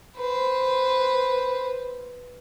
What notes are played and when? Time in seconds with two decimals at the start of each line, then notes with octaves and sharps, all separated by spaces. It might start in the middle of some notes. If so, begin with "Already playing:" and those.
0.17 B4 C5